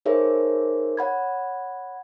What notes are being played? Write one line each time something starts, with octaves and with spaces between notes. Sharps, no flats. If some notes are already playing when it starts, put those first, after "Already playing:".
D#4 G#4 A#4 C5 C#5 E5
C#5 F#5 B5 G#6